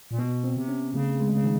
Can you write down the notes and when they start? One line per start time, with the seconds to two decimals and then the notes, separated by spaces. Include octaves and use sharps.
0.11 A#2
0.18 B2 B3
0.44 C4
0.57 C3
0.68 C#4
0.94 C#3 A3
1.20 G#3
1.32 C#3
1.44 D#3